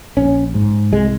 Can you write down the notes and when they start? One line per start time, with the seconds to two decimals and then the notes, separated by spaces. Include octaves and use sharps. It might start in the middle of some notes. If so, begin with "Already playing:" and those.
0.17 A#1 C#4
0.54 G#2
0.93 C2 G#3